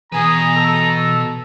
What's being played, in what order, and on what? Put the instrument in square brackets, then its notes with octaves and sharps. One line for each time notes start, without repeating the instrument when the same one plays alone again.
[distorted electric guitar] B2 B4 [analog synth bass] E3 [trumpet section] G#4 [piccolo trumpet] A#5
[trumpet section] A4